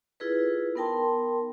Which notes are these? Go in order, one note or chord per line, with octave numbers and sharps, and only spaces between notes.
E4 F4 G#4 A4 B4
B3 D#4 A#4 G5 A5 C6